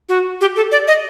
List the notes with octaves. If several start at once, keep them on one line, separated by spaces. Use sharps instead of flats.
F#4
G4
A4
D5
D#5